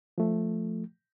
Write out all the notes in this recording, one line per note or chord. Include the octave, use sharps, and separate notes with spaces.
F3 A3